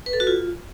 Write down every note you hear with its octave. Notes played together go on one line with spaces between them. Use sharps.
B4
A4
F#4
F4